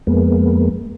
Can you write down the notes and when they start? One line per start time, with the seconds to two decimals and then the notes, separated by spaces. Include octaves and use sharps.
0.07 F2 G#3 A#3 B3